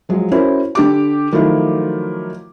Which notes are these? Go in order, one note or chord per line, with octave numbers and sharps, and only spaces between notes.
F3 F#3 G#3
C#4 E4 F#4 A#4 C5
D3 G4 D6
D#3 F3 F#3 A3 E4 F4